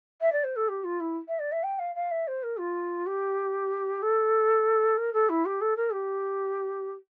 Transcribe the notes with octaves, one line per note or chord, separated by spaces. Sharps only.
E5
D5
C5
A4
G4
F4
E4
E5
D5
E5
G5
F5
F5
E5
C5
A#4
F4
G4
A4
A#4
A4
E4
G4
A4
A#4
G4